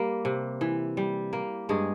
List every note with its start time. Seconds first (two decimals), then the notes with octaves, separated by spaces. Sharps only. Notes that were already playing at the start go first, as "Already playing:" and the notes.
Already playing: G3 A#3
0.25 C3
0.61 E3
0.97 G3
1.33 A#3
1.69 G2 G#3 G#4